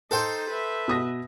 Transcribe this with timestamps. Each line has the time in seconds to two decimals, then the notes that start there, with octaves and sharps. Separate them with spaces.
0.11 D#4 A4 C5 G5
0.49 B4 E5
0.88 B2 D#6 A#6